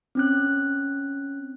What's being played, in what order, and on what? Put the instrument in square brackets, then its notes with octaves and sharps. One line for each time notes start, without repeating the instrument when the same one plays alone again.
[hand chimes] C4 C#4 F#6